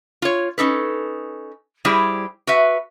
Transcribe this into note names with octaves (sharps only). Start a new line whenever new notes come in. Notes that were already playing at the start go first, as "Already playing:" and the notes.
F4 C#5
C#4 D#4 A4 B4
G3 E4 G4 G#4 C5
F#4 B4 E5